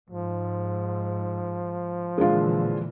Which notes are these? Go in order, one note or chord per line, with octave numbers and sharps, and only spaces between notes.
G#2 F3
A#2 D3 E3 G#3 D4 F4